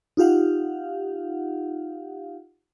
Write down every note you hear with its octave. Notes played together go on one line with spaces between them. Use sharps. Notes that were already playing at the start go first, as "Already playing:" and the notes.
D#4 F4 G4 F5 F#5